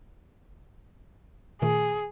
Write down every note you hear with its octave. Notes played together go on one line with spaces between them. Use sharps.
A#2 D#3 A3 G#4